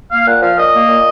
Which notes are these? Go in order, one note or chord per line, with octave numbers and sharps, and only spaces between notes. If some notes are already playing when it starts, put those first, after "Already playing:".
A#3 F5
A#2 F#5
F3 F5
A#2 D#5
A#3
A#2